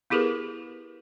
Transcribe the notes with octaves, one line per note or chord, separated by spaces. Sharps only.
B3 E4 G4 G#4 A#4 B4